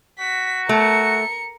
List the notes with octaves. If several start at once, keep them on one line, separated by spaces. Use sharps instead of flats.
F#4 B6
A3 A#4 C#7